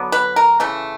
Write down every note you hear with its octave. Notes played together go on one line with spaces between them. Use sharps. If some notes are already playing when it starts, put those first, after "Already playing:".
Already playing: D3 F#3 B3
B4
A#4
C#3 E3 A3